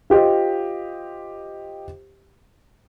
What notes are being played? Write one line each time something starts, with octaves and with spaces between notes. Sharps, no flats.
F4 G4 C5 D#5